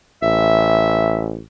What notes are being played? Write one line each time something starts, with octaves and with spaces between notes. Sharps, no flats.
A1 E5